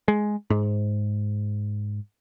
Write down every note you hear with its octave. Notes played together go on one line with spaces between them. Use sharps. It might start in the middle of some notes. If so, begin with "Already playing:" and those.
G#3
G#2